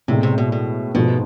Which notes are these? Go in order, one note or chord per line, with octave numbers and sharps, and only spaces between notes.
A2 C3 G#3 B3
C3
B2
B2
G#2 B2 F3 A3